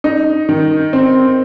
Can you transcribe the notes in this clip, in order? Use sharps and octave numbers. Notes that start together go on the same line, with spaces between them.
D#4
D#3
C4